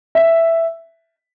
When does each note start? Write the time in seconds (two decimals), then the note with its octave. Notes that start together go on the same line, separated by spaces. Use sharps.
0.15 E5